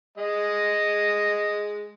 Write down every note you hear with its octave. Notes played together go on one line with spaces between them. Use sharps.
G#3 D#5